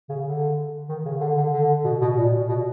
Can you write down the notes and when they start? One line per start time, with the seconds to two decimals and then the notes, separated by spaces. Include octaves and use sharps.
0.09 C#3
0.25 D3
0.89 D#3
1.05 C#3
1.20 D3
1.37 D3
1.53 D3
1.84 B2
2.01 B2
2.17 A#2
2.49 B2